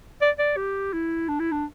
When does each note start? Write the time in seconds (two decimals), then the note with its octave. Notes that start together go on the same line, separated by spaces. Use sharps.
0.22 D5
0.39 D5
0.57 G4
0.93 E4
1.29 D4
1.40 E4
1.52 D4